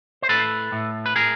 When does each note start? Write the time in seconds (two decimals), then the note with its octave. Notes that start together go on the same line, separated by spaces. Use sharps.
0.22 C5
0.29 A2 A4 B4
0.72 A2
1.06 B4
1.16 A2 G#4 A#4